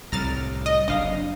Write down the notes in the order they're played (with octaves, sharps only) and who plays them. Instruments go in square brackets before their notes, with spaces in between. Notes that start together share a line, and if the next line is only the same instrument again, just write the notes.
[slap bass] C2 A2 [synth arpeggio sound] A#5 F6 A6
[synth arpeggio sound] D#5
[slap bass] F#1 C3 D4 [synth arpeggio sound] D#5 F5 A#6